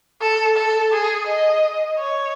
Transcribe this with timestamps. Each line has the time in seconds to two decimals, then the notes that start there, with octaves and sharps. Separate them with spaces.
0.21 A4
0.57 A4
0.92 G#4
1.28 D#5
1.99 C#5